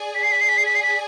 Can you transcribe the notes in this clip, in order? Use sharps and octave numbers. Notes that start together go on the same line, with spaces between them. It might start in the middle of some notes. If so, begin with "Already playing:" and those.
Already playing: G#4 D5 G#5
B6
C7
B6
C7
B6
C7
B6
C7
B6